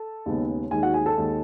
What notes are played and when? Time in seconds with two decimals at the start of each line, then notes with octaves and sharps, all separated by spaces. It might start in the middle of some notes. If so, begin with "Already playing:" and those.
Already playing: A4 A5
0.26 D#2 C#3 G#3 B3
0.71 D#2 D#3 G#3 G#4 G#5
0.83 F#4 F#5
0.94 G#4 G#5
1.06 A4 A5
1.17 D#2 D#3 G#3